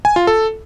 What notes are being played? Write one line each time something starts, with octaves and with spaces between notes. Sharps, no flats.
G#5
F4
A4